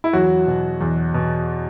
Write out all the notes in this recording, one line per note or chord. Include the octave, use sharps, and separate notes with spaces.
E4
E2 F#3 F#4
B2
E2
B2